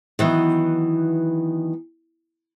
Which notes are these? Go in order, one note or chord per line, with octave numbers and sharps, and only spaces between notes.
D#3 E3 F#3 B3